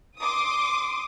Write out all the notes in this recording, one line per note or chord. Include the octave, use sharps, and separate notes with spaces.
C6 D6 D#6